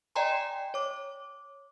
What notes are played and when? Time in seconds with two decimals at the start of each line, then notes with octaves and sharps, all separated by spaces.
0.16 D5 D#5 G5 G#5 A#5 C6
0.74 C#5 D6